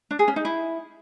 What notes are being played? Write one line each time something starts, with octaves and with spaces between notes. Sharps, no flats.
D4
G#4
C#4
D#4
E4